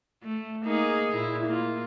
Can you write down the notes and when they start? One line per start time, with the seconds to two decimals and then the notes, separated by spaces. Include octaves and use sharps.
0.23 A3
0.65 A#3 D#4 G#4
1.15 A#2 E4
1.46 A#3 F4